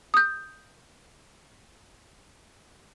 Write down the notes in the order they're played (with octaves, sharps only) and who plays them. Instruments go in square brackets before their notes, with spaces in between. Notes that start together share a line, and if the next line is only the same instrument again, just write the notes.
[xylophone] D#6 G6